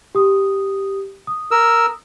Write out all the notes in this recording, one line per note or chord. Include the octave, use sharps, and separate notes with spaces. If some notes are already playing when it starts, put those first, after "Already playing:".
G4 D#6
D#6
A#4 E6